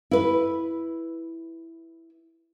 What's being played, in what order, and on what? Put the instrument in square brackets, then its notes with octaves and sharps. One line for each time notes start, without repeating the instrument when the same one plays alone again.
[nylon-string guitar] E4 B4